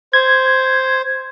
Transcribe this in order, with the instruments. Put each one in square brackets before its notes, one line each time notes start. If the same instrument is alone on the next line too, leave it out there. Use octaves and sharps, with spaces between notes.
[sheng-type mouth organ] C5 [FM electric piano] G#6